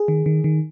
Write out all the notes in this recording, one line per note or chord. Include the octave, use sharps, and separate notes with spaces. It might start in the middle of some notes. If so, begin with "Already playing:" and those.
Already playing: G#4
D#3
D#3
D#3